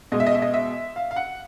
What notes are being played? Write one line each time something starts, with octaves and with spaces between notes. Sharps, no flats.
B2 G#3 D#5
E5
D#5
E5
D#5
E5
F5
F5
F#5